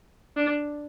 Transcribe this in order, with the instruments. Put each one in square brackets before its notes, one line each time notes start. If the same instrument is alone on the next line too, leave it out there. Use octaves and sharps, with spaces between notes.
[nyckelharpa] D4